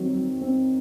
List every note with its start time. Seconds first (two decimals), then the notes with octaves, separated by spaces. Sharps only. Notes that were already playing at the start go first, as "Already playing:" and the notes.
Already playing: D#3 F#3 C4
0.14 F#3
0.41 C4